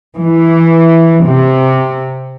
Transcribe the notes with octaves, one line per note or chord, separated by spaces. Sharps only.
E3
C3